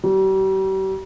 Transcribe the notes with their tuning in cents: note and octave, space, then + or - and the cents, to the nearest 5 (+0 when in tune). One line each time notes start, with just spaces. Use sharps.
G3 -40